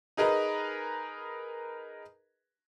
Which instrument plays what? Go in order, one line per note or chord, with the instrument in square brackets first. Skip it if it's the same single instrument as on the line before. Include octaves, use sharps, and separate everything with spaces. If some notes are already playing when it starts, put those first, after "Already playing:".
[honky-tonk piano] D#4 G#4 A#4 B4 D#5